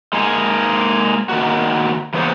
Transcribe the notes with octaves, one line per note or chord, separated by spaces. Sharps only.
G#3 A#3 D#4 G#4
D#3 A#3 F#4
E3 A#3 B3 G#4 C5 C#5